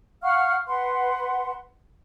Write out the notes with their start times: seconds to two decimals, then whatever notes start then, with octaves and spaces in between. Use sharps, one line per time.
0.23 F5 F#5 C#6 F6
0.67 B4 F#5 C6